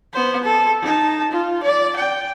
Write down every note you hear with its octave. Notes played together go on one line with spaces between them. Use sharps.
B3 C5
A4
D#4 A5
F4
D5
G5